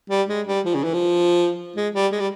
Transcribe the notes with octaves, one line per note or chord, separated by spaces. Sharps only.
G3
G#3
G3
F3
C#3
E3
F3
G#3
G3
G#3
G3